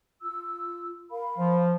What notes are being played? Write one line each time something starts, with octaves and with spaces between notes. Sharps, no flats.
F4 E6
A#4 F5 B5
F3